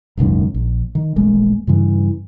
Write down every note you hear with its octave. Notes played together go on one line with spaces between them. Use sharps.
E1 C#2 F#2 D#3
A#1
D#3
D#1 A1 G#3 A#3
G2 C#3 E3